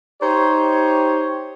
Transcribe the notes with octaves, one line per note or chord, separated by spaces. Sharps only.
D#4 G4 C5 C#5